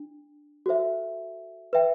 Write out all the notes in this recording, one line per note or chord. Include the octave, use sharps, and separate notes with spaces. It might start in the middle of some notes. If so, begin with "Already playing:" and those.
Already playing: D4
F#4 A4 C5 E5
B4 E5 G5